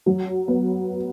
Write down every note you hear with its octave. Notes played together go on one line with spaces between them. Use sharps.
F#3
B3